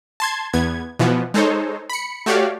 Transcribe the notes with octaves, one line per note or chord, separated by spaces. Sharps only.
A5 C6 G#6
E2 B3 G#6
B2 E3 F3 B3
G#3 D#4 A4 C5 C#5
B5 C#7
A3 F#4 G4 C#5 D5 F5